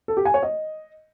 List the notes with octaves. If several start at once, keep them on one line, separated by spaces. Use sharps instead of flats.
A4
G4
G#5
C#5
D#5